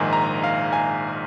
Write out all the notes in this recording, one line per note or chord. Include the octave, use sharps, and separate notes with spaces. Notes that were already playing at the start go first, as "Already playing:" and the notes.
Already playing: A#1 G#2 D#3 G#5
A#5
F5
G#5